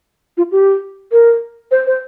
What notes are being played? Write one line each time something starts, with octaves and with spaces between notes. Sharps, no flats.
F4
G4
A#4
C5
C5